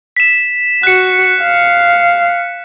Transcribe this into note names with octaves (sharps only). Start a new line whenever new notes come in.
B6 E7
F#4 F#6 C#7
F5